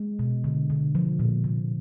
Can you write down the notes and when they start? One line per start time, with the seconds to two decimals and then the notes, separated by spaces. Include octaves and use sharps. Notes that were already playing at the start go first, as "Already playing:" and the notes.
Already playing: G#3
0.19 B2
0.44 D3
0.70 D3
0.95 F3
1.19 A#2
1.44 C3